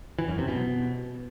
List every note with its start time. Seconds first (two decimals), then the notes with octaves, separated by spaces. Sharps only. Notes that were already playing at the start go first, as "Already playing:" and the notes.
0.19 E3
0.28 F#2
0.38 C3
0.48 B2